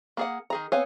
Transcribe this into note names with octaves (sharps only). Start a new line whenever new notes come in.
A#3 G#4 F#5
D#3 G#4 A#5
B3 C4 C#5 F5 G#5